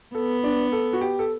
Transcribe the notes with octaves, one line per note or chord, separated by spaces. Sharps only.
B3 A4
D4
A4
F#4
G4
A4